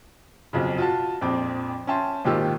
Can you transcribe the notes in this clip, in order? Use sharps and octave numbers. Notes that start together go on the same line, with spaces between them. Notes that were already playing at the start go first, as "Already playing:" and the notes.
B1 F2 C#3
F4 F#4 A5
A#1 F2 C4 D6
C#4 E5 G5 A5 C6
G#1 A#2 D#3 F4 G4 E6